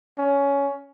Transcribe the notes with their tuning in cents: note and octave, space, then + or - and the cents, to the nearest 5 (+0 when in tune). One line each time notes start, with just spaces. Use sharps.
C#4 +15